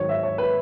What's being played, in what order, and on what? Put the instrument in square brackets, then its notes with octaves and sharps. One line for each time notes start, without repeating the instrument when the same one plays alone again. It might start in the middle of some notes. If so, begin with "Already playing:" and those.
Already playing: [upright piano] G#2 D#3 F#3 C#5
E5
C#5
B4